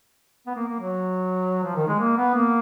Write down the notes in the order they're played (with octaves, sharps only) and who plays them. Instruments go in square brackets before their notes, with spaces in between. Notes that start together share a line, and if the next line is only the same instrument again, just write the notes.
[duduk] B3
A#3
A#3
F#3
F3
D#3
G#3
A#3
B3
A#3